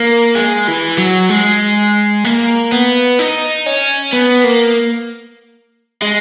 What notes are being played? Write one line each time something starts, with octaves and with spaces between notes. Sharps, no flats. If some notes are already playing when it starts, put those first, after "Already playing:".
Already playing: A#3
G#3
E3
F#3
G#3
A#3
B3
D#4
C#4
B3
A#3
G#3